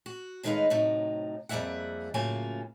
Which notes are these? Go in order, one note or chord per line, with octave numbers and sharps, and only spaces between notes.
F#4
A2 D#3 G#3 D#4 B4 F5
A2 C3 F#3 D#4
F2 G3 A#3 G#4 E5 F#5
A2 C#3 F#3 A#3 F4 G#5